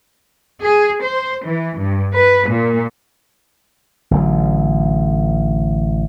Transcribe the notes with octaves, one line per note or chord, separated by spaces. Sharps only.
G#4
C5
E3
G2
B4
A#2
A1 D3 F#3